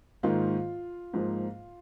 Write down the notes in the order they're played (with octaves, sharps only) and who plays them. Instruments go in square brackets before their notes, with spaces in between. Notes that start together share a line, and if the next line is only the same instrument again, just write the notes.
[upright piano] G#2 D#3 A#3 F4
G#2 F3 A#3